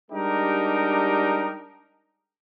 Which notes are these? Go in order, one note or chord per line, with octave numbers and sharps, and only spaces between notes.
G3 G#3 D4 D#4 G4 A#4